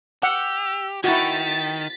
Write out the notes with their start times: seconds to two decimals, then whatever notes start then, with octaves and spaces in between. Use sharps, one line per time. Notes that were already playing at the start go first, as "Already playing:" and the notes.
0.23 G4 F#5 E6
1.04 D#3 E4 F#4 G5 A6 B6